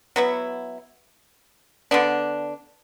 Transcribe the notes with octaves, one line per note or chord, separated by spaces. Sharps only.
F#3 B3 E4
D3 B3 D4